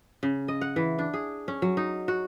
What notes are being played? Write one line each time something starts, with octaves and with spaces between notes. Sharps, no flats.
C#3
D#5
F#5
E3
D4
G#4
C#4
F#3
D#4
F#4